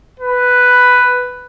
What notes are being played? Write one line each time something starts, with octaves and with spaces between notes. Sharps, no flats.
B4